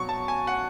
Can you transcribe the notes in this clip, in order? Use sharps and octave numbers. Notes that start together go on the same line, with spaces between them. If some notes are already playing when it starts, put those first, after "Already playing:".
Already playing: B2 F#3 C#6
A5
G#5
F#5